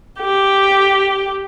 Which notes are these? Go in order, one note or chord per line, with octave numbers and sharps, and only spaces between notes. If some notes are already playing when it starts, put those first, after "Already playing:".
G4